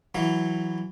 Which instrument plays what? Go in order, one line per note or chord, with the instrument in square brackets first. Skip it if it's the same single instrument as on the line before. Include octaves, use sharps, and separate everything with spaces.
[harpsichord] E3 F#3